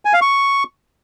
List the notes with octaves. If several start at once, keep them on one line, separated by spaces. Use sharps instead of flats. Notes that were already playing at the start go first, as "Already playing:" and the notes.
G#5
F5
C#6